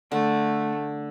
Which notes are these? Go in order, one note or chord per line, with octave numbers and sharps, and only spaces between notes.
D3 A3